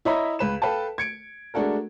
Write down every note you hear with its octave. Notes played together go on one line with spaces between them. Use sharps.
E4 C#5 D#5 E5 A#5 B5
C#2 B4 E7
A4 B4 F5 G5 A5
G#6 C#7 D7
G#3 A3 D4 F#4 A4 A#4